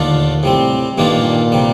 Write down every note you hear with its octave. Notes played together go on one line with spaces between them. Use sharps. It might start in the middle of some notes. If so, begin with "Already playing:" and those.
Already playing: D#2 A#2 D3 A3 D4 F4
A2 C3 G3 C4
G2 A#2 D#3 A#3 D4 F4
C3 G3